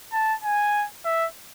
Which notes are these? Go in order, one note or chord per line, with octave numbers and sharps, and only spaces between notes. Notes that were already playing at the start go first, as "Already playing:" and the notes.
A5
G#5
E5